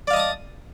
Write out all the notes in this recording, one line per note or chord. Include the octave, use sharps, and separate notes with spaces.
D5 D#5 F5 A5 D#6